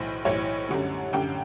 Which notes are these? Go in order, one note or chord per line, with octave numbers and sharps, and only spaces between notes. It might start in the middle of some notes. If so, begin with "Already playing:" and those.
Already playing: B1 A2 E3 C5
B1 A2 E3 C#5
F#2 D3 G3
F#2 D3 G3 G5